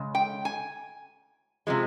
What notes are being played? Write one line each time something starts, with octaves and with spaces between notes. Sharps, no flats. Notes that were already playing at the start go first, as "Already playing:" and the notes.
Already playing: C#3 G#3
G5
G#5
C3 F3 G#3